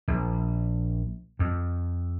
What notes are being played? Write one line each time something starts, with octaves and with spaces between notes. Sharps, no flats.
A#1
F2